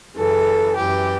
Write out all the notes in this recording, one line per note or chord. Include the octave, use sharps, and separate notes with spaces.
F#2 C#3 E3 A4
F#2 E3 G4